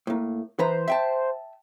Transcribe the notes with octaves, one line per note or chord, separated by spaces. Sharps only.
A2 A#3
E3 B4 C5 A#5
E5 G5 A5